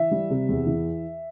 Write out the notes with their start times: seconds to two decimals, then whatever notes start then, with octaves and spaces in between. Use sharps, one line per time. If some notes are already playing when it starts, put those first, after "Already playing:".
Already playing: E3 E5
0.11 G3
0.30 C3
0.49 E2
0.67 E3